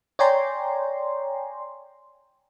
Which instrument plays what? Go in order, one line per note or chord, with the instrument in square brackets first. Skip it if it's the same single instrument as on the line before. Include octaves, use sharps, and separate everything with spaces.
[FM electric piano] C#5 D5 G5 G#5 A#5 C6